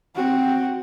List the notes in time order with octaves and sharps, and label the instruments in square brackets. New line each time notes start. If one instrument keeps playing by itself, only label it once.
[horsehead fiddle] C4 F#4